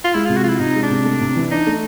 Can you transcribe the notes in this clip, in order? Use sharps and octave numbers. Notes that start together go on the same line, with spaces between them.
F4
G#3 E4
C3 F4
F#4
F3 E4 F4
C3 D#4
G#3
D4
C3
A3
C3
E3
D4 D#4
A3